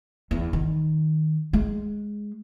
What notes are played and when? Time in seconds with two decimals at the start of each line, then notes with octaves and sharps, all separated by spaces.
0.31 E2
0.53 D#3
1.53 G#3